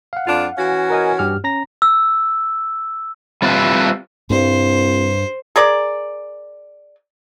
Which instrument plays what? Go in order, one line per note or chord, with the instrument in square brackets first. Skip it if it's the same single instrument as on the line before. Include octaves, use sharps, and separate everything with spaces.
[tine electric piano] F5 F#5
[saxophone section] F2 D4 F4
E3 C#4 F#4
[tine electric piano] A#4 D#5 G#5
G2 G4 F6
C#4 A#5 A#6
[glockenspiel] E6
[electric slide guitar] G3 C4 F4 F#4 B4 E5
[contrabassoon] C2 [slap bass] G2 [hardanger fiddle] C5
[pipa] G#4 A#4 D5